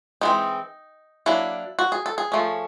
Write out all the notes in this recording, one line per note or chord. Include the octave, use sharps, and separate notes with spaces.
E3 G#3 C4 D#4
F#3 A#3 D4 E4
F#4
G#4
A4
G#4
F3 A3 C#4